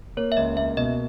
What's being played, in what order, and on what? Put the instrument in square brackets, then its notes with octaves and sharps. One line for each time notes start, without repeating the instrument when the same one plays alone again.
[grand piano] A#3 [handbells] C#5
[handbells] E5
[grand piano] C#2 [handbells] D#5
[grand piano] A#3 [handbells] E5
[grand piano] B2 [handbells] D#5